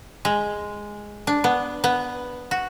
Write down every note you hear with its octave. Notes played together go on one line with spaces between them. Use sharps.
G#3
D4
B3
B3
F#4